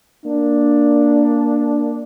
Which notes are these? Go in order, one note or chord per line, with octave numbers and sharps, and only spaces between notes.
A#3 D4